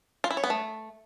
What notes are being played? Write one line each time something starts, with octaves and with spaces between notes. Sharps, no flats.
F4
E4
C#5
B3
A3